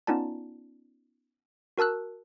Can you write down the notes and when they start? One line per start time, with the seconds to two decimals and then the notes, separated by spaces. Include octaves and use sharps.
0.07 B3 C#4 D#4 F4 D5 A5
1.78 F#4 A#4 A5 E6 F#6